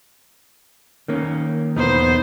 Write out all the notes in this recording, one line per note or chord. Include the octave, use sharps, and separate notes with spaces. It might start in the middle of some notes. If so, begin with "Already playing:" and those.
D#3 A#3 C#4
B1 E2 B3 D#4 C5